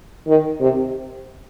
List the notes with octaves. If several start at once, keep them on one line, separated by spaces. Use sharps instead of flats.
D#3
C3